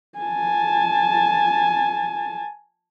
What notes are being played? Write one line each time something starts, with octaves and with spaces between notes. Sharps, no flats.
G#5 A5